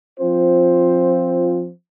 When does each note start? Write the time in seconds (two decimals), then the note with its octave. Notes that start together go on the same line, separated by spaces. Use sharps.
0.19 F3 C4 F4 C5